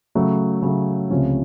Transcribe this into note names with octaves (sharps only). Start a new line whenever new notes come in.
C#3 F#3 A3
C#3 F#3 A3
C#2 C3 F3 A3 C#4